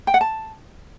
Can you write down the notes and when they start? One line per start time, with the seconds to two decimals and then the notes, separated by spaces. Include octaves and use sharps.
0.07 G5
0.14 F#5
0.21 A5